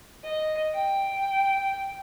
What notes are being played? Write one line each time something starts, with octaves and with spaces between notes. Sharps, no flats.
D#5
G5